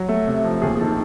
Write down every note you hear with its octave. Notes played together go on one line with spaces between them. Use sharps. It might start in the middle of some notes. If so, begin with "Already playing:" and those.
Already playing: F#3
A3
C3
F3
D#2 G#4
G#4
D#3 A4